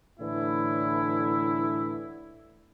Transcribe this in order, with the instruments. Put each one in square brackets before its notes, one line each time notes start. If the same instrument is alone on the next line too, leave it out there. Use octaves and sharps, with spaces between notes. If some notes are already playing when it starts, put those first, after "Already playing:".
[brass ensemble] A2 D3 E3 E4